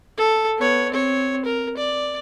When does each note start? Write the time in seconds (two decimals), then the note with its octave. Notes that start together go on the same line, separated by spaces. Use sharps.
0.17 A4
0.57 B3 C#5
0.92 C4 C#5
1.45 A#4
1.77 D5